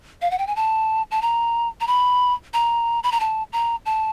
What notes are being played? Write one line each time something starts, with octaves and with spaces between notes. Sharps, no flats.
F5
F#5
G5
G#5
A5
A5
A#5
A#5
B5
A#5
B5
A#5
A5
A#5
A5